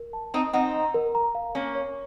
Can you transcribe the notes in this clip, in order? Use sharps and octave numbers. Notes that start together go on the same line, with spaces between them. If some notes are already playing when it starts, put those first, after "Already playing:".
Already playing: A#4
A5
C4 D#4 D#5
C4 D#4 F#5
A#5
A#4
A#5
F5
A#3 C#4 C#5
C#5